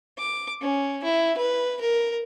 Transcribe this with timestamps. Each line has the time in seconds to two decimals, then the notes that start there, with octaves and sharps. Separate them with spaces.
0.18 D6
0.61 C#4
1.04 E4
1.37 B4
1.81 A#4